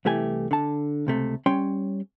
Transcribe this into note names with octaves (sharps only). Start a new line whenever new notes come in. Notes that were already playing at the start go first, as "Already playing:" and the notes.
C2 E3 A3 G4 G#5
D3 A5
C#2 C3 A3
G3 C#4 C#5 G5 C6